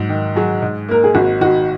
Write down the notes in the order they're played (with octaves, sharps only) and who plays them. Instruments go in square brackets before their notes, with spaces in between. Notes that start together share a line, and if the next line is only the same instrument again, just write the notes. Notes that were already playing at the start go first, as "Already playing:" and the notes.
Already playing: [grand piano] G#2 F#3
D#3
[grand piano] F#3 [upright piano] G#4
[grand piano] G#2
[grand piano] A#3 [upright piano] A#4
[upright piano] G#4
[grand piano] G#1 [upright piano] F#4
[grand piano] D#3 [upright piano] F#4